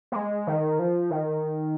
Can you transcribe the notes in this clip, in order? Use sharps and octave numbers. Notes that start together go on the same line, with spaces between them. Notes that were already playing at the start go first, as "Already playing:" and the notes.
A#3
G#3
D#3
F3
D#3